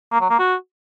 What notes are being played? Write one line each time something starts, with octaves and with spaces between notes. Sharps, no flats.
A#3
F#3
A#3
F#4